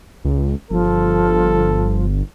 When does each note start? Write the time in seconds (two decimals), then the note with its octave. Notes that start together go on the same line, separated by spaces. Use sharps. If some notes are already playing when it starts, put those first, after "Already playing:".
0.25 C#2
0.71 G1 F3 A4